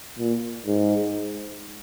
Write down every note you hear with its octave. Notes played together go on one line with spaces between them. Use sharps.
A#2
G#2